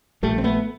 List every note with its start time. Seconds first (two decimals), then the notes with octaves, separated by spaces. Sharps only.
0.23 A#1 G3 A3
0.38 C4
0.44 A3 B3